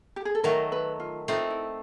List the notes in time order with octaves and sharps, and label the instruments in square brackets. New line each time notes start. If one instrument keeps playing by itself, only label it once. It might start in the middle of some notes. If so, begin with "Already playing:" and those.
[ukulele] G4
G#4
A4
[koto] D#3 F#3 A3 [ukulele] A#4
[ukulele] B4
F4
[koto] A3 C4 D#4 [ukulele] F4
[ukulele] E4